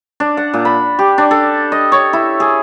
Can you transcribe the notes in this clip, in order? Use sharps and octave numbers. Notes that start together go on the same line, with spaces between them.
D4
F#5
A#2
B5
G4
D4
A4
D#5
C#5
E4
G#4